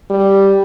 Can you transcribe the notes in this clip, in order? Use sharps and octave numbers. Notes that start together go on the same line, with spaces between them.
G3